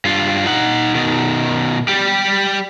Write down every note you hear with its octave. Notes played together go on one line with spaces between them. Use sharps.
G2 F4
D#4 F#5
B2 D#3
G3 G4